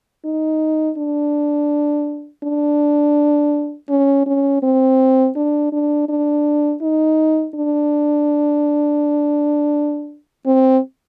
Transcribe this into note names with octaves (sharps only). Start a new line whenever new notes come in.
D#4
D4
D4
C#4
C#4
C4
D4
D4
D4
D#4
D4
C4